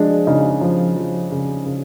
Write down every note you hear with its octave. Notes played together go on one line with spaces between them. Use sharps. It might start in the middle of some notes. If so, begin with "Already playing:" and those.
Already playing: F3 G#3 D4
C#3 D#4
F3
F3
C#3
C#3